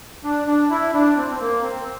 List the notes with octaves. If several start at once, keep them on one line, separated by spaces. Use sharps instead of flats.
D4
D4
E4
D4
C4
C4
A#3
C4